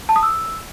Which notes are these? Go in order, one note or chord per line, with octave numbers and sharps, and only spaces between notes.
A5
D#6
E6